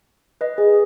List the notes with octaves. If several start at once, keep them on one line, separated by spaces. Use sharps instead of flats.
B4 D#5
G#4